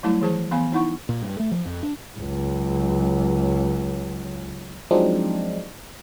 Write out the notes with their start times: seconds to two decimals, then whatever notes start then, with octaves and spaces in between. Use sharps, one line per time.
0.03 F#3 G3 A3 E4 A5
0.21 E3 F3 G#4 C5 A5
0.51 E3 B3 F5 G#5 B5
0.72 D#4 E4 F#5 C#6
1.09 A#2
1.22 G2
1.39 A3
1.51 F3
1.66 F2
1.83 D4
2.19 C#2 F#3
4.91 F3 F#3 G#3 C4 D4 D#4